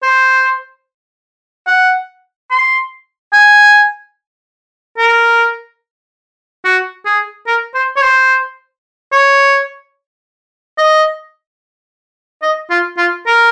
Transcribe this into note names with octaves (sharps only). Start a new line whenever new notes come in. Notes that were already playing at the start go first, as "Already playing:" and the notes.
C5
F#5
C6
G#5
A#4
F#4
G#4
A#4
C5
C#5
C5
C#5
D#5
D#5
F4
F4
A#4